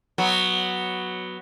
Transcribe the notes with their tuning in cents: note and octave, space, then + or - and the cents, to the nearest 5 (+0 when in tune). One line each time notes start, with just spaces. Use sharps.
F#3 +0 B3 +0